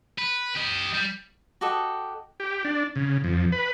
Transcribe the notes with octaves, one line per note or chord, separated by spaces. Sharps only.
B4
G4 D#5
G3
F#4 G4 A4 D#5
G4
D4
C#3
F2
B4